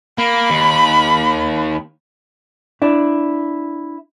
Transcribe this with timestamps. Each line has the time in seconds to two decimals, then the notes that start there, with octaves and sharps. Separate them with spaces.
0.18 A#3 B5
0.50 D#2
2.82 D4 E4